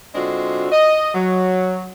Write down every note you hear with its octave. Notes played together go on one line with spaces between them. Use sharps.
D3 G#3 C4 D4 F4 F#4
D#5
F#3